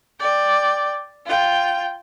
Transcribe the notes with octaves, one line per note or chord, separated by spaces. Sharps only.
D5 G5
F4 G5